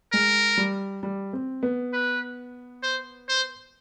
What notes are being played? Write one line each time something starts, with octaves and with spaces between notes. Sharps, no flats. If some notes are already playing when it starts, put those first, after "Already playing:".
G#3 A#4
G3
G3
C4
B3
B4
C5
C5